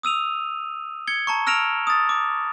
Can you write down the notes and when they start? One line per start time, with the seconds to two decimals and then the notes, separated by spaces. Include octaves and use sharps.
0.03 D#6 E6 D#7 F7
1.07 G#6 C#7 G7
1.27 A5 A#5 C#6
1.47 E6 F6 A#6 D7 E7 F7
1.87 D#6 A6
2.09 D6